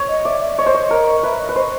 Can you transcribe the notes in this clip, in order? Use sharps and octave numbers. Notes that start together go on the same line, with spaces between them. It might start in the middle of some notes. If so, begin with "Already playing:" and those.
Already playing: C#5
D#5
D5 E5
E5
C#5 D#5
C5
C#5
A#4
B4 E5
D#5
B4
C5 D#5